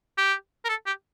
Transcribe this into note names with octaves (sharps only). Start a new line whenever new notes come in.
G4
A#4
A4
G4